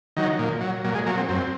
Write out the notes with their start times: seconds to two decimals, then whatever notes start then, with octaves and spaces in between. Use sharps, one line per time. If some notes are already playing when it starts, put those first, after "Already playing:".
0.17 D#3 F#3
0.39 A#2
0.61 F#3
0.84 A#2 F#3
0.95 G#3
1.06 F#3 A#3
1.17 C4
1.29 F#2 C4